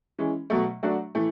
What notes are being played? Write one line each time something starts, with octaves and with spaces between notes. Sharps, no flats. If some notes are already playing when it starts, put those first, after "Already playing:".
E3 G#3 C#4
B2 F#3 A3
F#3 A3 D4 F#4
A2 E3 A3